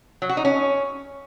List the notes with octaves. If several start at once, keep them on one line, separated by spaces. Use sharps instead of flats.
F#3
F#4
D#4
C#4